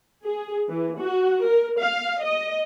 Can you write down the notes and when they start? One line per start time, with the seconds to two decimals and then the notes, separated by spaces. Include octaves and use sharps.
0.24 G#4
0.68 E3
0.98 F#4
1.43 A#4
1.79 F5
2.21 D#5